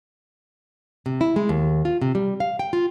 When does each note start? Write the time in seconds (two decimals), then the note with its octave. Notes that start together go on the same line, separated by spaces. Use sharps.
1.06 C3
1.21 E4
1.36 G#3
1.49 D#2
1.85 F4
2.02 C3
2.15 G3
2.40 F5
2.59 G5
2.73 F4